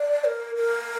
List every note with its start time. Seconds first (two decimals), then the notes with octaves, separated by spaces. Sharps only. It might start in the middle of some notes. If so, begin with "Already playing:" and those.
Already playing: D5
0.25 A#4
0.55 A#4